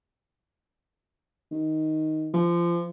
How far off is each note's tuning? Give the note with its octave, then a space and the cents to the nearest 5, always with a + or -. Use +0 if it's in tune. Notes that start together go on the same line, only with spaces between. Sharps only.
D#3 +5
F3 -25